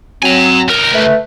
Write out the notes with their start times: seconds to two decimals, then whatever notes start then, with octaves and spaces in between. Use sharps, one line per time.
0.23 F#3 C4 G#5 A#5
0.68 C#2 A#4
0.93 A3 B4